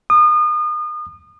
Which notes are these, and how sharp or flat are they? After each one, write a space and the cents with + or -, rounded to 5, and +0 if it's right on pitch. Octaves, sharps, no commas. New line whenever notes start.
D#6 -35